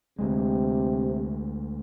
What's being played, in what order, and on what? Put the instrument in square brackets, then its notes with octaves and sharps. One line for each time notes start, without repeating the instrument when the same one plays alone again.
[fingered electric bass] D2 G#3 [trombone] C3